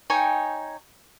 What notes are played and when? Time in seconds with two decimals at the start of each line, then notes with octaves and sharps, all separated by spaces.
0.10 D#4 C#5 G5 G#5